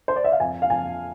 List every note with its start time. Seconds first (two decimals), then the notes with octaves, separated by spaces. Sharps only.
0.08 C5
0.16 D5
0.24 E5
0.32 F5
0.40 F2 G#5
0.62 F5
0.70 F2 G#5